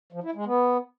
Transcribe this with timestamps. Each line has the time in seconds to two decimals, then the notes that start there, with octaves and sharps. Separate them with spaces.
0.12 F3
0.24 E4
0.35 G#3
0.46 B3